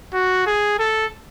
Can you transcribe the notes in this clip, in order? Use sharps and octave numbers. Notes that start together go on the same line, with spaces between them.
F#4
G#4
A4